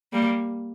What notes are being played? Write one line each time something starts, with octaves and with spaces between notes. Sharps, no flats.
G3 A#3